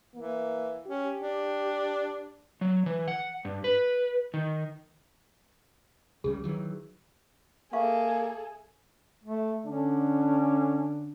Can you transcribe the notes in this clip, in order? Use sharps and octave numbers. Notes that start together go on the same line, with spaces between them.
E3 A#3
C#4 G4
D4
F#3
E3
F#5
G2
B4
D#3
C#2 C#3 G3 G#4
D#3 E3 F#3
A#3 G#4 A4 E5 F5 C#6
A3
D3 C#4 D4